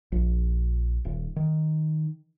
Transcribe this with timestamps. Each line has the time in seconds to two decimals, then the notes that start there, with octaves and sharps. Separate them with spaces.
0.12 A#1
1.05 D#1
1.36 D#3